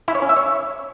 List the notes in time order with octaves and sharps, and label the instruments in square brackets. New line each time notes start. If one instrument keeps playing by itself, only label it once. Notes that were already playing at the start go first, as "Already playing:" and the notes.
[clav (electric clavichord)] E4
C#5
C#4
E5
C#5